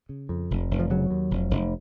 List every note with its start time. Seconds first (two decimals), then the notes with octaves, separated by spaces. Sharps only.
0.09 C#3
0.29 F2
0.50 F1
0.71 F1
0.79 F3
0.90 C#3 F#3
1.11 D#2
1.31 F1
1.51 F1